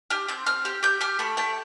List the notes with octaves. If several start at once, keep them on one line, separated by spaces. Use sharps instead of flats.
G4 F6
C4 G6
C4 F6
G4
G4 G6
G4 F6
A3 B5
A3 G5